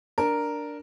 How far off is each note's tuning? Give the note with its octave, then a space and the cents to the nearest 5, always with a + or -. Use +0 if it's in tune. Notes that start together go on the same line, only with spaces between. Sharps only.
D4 +0 A#4 +0